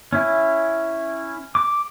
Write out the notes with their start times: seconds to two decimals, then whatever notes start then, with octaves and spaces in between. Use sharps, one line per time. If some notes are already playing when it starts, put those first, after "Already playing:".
0.13 C#4 E4
1.55 D6